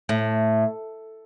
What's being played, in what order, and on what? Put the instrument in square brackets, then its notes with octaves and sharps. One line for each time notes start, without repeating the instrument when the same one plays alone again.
[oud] A2